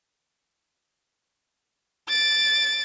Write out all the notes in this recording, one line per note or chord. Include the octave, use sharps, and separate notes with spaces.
A6 D7